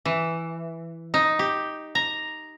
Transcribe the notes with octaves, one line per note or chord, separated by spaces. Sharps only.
E3
D#4
G4
A#5